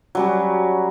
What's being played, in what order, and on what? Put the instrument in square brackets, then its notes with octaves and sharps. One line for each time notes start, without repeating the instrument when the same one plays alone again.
[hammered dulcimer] F#3 G3 C#4